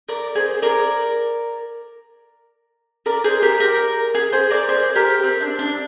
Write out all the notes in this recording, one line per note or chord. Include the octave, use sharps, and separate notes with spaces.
A#4 D5
G#4 C5
A#4 D5
A#4 D5
G#4 C5
G4 A#4
A#4 D5
G#4
G#4 C5
A#4 D5
G#4 C5
G4 A#4
C4
D4
D4